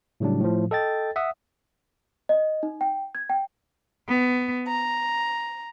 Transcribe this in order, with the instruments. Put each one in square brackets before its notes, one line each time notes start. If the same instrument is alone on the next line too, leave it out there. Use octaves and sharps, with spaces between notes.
[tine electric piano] A2 C#3 F#3 G3 D4
A2 F3
A4 D#5 G5 A6
E5 F#5 D#6
[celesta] D#5
D#4
G5
G#6
G5
[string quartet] B3
A#5